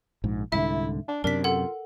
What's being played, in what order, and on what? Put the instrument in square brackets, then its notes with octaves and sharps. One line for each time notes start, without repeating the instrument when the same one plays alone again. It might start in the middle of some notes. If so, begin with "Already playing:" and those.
[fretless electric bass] A#1 G#2
[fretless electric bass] C2 G#2 D3 [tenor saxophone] E4 [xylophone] E5
[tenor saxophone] D4
[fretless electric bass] F#2 C3 [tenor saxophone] D4 [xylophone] A#4 B6
[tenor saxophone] F4 [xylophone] A4 F#5